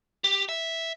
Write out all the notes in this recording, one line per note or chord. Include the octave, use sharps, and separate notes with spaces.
G4
E5